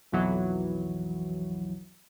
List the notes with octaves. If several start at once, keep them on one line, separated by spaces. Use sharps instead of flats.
B1 F2 E3 F#3